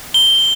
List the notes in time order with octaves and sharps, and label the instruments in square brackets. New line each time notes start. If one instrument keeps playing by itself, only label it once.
[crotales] G7